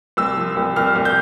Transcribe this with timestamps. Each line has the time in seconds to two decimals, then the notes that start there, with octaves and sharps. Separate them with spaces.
0.17 C2 E6
0.37 F3
0.56 C2
0.76 C2 F6
0.96 C2
1.05 G6